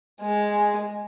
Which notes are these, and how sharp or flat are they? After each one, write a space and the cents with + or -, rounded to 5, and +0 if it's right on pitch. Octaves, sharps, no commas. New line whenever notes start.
G#3 +0